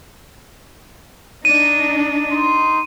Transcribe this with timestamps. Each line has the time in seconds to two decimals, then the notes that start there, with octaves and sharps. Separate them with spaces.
1.45 D4 D#4 D#7
2.32 D#4 C6